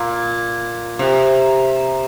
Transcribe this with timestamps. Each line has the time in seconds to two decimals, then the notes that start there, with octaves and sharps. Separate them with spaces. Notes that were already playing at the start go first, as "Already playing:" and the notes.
Already playing: A#2
0.99 C3